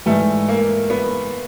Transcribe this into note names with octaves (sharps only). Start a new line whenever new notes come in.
G#2 E3 G3 A3
A#3
B3